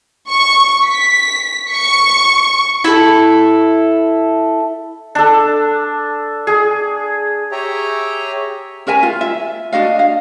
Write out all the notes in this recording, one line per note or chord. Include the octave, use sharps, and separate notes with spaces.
C#6
B6
C#6
E4 A4
D4 A4
G#4
G4 G#4 C#5 E5 G5 A#5
C#4 A#4 E5 G#5
F4
E5
D4 F#4 D#5 F5
F5